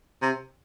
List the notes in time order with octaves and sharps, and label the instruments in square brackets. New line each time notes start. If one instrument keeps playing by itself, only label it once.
[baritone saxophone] C3